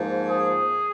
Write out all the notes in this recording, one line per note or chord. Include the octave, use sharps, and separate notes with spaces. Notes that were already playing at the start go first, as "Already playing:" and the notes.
Already playing: G#2 F3 A#3
G#4